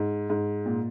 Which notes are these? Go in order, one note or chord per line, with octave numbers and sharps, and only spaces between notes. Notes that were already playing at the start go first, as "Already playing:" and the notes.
Already playing: G#2
G#2
A#2